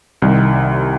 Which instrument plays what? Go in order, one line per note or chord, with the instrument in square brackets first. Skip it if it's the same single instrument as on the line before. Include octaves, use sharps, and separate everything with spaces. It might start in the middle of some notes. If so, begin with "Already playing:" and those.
[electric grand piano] C2 C3 D#3 G3